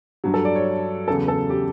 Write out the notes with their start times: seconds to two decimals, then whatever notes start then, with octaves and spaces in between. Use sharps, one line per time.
0.24 G2 F#3
0.34 A4
0.45 D5
0.55 C#5
1.08 E2 C#3 F#3 A4
1.28 A4
1.50 G4